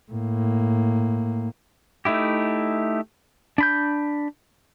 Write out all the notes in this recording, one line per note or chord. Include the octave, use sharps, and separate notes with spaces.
A2 A#3
A3 D#4 E4 G4
D4 B5 G6